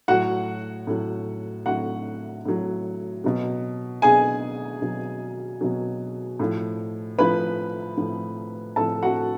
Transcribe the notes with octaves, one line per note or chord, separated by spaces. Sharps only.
A2 F#3 F#4 F#5
A2 F#3
A2 F#3 F#4 F#5
A2 F#3
B2 F#3
B2 F#3 G#4 G#5
B2 F#3
B2 F#3
A2 F3
A2 F3 B4 B5
A2 F3
A2 F3 A4 A5
F#4 F#5